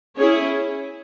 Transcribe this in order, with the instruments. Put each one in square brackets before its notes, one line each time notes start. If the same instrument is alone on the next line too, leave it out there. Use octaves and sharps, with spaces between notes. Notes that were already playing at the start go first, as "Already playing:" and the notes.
[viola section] C#4 E4 G#4 C#5